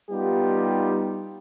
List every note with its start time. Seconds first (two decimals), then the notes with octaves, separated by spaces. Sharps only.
0.10 G3 B3 D#4 F4 G4